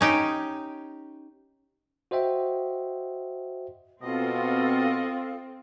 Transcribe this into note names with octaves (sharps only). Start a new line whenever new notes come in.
C#4 D#4 G4
F#4 C5 D#5 E5 G5
B2 C4 F4 A4 D#5 F5